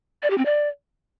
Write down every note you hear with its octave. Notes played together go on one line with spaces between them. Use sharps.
D5
G4
C4
D5